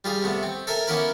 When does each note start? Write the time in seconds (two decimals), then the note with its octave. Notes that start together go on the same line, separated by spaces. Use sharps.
0.04 G3 F4 G#4
0.23 C3 A3 B3
0.43 C4
0.67 A4 A#4 E5 G#5 A#5
0.87 A#3 B3 C#4 E4 A#4 B4